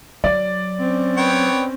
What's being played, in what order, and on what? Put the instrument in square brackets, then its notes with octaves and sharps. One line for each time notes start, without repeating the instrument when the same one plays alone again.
[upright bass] F#3 [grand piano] D5
[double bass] C4 C#4
[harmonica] B3 C#5 G5